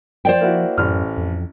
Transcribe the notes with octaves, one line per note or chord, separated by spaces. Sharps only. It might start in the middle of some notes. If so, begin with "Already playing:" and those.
F3 C5 D5 G5
A#3 E4 F#4
A1 F#2 F6
F2